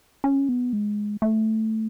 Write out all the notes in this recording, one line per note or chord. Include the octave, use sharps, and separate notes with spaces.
C#4
B3
G#3
A3